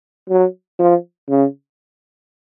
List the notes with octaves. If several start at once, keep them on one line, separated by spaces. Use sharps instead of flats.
F#3
F3
C#3